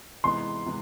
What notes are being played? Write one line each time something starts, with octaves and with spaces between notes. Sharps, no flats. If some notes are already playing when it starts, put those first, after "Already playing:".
C3 E3 G#3 B3 D#4 C6
C3 E3 G#3 B3 D#4